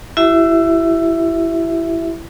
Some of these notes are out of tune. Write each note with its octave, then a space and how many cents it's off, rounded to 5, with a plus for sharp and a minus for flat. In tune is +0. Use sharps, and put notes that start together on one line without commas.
E4 +15 G4 -45 E5 +0